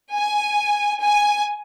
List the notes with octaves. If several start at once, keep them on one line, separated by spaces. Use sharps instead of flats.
G#5
G#5